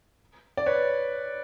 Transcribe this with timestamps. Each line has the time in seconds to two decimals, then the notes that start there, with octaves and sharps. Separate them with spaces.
0.57 D5
0.66 B4 C#5